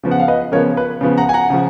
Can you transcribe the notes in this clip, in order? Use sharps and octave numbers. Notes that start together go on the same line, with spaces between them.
C#3 F3 B3
F#5
F5
B4 D#5
C#3 F3 B3 A#4 C#5
B4
C#3 F3 B3
F#5 A#5
G#5
F#5 A#5
C#3 F3